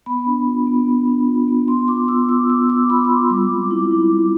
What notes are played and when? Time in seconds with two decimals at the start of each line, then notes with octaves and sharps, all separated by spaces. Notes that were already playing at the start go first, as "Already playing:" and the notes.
0.06 B3 B5
0.26 D4
0.47 F4
0.67 B3
0.87 B3
1.07 D4
1.28 F4
1.48 B3
1.68 B3 C6
1.88 F4 D6
2.08 B3 E6
2.29 F4 D6
2.49 B3 E6
2.70 F4 D6
2.89 B3 B5
3.05 D6
3.10 F4 C6
3.30 G3 D6
3.51 C4
3.71 E4
3.91 G3
4.11 G3